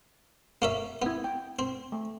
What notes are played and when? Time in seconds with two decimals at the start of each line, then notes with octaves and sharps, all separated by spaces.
0.62 A#3 C#4 E5
1.02 B3 C4 E4
1.24 G5
1.59 C4
1.92 A3